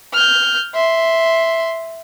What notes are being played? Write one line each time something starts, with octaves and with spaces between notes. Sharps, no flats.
F6 G6
E5 C6